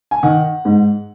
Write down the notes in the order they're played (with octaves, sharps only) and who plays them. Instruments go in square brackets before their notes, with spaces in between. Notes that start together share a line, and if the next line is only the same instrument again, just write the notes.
[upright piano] G#5
D#3 F#5
G#2